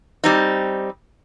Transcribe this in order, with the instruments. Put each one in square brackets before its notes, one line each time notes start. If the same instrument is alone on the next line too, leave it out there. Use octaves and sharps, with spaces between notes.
[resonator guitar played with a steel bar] G3 C4 D#4